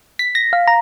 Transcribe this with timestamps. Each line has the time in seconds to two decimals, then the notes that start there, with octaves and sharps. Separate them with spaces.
0.19 B6
0.35 A#6
0.53 F5
0.67 A#5